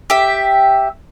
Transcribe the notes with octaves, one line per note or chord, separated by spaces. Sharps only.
G4 E5